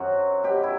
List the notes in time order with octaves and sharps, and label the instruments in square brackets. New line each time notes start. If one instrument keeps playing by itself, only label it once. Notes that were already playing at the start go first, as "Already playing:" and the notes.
Already playing: [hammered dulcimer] F#2 D#3 F#3 C4 F#4
B2 F#3 G4
E4